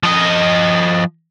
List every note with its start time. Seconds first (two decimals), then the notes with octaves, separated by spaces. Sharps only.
0.03 F3 D#5